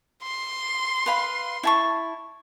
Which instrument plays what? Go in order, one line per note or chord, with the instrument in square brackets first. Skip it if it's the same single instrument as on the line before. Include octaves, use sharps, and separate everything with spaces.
[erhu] C6
[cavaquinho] B4 F5 B5
E4 A5 C#6